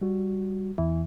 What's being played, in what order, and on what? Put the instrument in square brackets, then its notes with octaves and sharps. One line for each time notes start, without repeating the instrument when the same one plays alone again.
[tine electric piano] G3 F#4
[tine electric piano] E2 [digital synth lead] E3